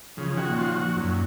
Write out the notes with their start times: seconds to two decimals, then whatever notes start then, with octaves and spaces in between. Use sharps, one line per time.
0.17 C#3 F3
0.28 F3
0.37 D#3 F#4
0.48 A#2
0.57 F3
0.76 F#4
0.96 F#2